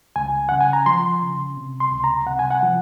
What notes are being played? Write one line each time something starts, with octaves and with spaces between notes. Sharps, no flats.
C#2 G#5
C#3 F#5
G#5
A#5
F3 C6
C#3
C3
C6
C#2
A#5
C3 F#5
G#5
F#5
F3